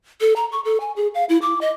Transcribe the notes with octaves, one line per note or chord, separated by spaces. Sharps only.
A4
A#5
C#6
A4
G#5
G#4
F5
E4
D6
D#5